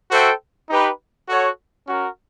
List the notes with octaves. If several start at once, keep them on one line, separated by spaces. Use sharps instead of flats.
F#4 A4 C5 E5 G5
D#4 G4 B4
F#4 A4 C#5 F#5
C#4 F#4 A#4